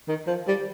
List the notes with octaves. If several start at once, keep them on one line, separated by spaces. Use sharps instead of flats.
D#3
F3
G3